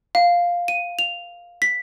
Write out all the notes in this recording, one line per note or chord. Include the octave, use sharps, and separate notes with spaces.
F5
D#7
F7
B6